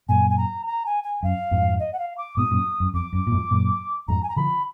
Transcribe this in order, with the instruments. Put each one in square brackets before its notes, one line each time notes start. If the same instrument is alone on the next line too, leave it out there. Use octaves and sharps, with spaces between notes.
[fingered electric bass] F#2 A#2 [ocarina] G#5
[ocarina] G#5
A#5
A#5
G#5
G#5
[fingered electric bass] F#2 [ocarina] F5
[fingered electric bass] F2 G#2
[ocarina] D#5
F#5
F5
D6
[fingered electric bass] G#2 B2 [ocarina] D#6
[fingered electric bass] F#2 A#2
F#2
[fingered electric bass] F2 [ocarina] D6
[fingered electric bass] F#2
A#2
F2 G#2
F#2 A#2
[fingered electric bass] F2 G#2 [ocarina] A#5
[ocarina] G#5
A#5
[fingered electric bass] D3 F3 [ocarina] B5